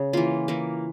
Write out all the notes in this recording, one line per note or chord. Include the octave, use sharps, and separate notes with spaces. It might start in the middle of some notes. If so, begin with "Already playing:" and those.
Already playing: C#3
E3 A#3 F4
E3 A#3